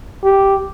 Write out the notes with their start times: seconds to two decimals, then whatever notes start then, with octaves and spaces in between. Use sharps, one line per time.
0.24 G4